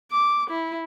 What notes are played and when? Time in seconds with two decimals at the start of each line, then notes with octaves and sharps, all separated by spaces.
0.12 D6
0.51 E4